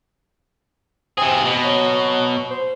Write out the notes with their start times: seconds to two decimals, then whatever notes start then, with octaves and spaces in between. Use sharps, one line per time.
1.18 C3 C4 G#4
1.45 B2
1.64 F#3
2.51 C5